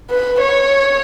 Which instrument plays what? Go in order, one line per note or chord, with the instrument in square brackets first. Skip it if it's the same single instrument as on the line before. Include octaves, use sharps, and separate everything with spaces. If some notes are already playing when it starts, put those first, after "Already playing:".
[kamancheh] B4
C#5